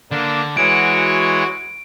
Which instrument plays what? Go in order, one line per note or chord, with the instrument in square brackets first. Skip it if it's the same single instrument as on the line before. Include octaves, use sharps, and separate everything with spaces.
[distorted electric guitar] D3 [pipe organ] A#3 D4
[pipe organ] E3 G#3 C#5 [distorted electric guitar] F#4 [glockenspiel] D7